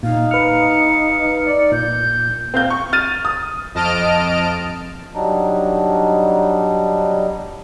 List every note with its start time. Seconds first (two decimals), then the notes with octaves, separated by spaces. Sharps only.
0.03 A#2 D#4 F5
0.31 B4 F6 C#7
1.46 D5
1.72 A#2 G6
2.54 C4 F5 G6
2.70 C#6
2.93 F6 A6 D#7
3.25 D#6
3.75 F2 D#5 A5 F6 D7
5.15 F#3 G3 D4 D#4